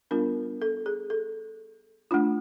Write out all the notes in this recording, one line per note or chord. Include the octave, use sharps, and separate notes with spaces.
G3 B3 D4 F4 A#4
A4
G#4
A4
A3 D4 F4